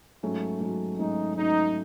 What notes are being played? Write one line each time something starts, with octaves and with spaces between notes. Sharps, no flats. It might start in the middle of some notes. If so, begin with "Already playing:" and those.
G#2 F#3 A3 C#4
G#2 F#3 A3 C#4
G#2 F#3 A3 C#4 D#4
G#2 F#3 A3 C#4 D#4